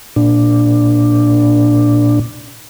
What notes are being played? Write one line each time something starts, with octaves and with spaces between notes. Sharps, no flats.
A#2 D4